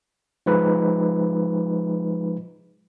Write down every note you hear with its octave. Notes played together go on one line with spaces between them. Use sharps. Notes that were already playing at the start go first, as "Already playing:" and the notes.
F3 G#3 D#4 B4